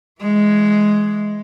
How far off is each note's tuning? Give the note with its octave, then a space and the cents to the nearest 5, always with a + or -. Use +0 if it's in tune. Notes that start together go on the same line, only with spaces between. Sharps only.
E3 +10 G#3 +5